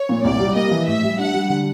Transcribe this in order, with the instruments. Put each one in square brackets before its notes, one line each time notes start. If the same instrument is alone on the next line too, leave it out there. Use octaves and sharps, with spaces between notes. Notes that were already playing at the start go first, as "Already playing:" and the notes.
Already playing: [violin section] C#5
[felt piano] A#2
[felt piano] C2 [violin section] D5
[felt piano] G3
[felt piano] A#3 [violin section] D#5
[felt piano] E3
[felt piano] A2 [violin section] E5
[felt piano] G3
[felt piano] D4 [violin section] F#5
[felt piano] G3
D3